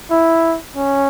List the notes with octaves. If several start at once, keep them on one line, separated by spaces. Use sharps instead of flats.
E4
C#4